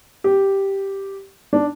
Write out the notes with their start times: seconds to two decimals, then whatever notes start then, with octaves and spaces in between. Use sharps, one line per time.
0.24 G4
1.53 D4